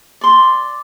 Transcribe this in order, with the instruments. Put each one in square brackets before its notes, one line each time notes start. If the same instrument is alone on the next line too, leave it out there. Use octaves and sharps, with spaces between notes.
[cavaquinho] D5 C6